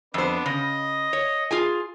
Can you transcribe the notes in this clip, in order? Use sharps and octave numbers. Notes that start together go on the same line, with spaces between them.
F2 B3 D4 C5
C#3 D#5
C#5
F4 G#4 G#5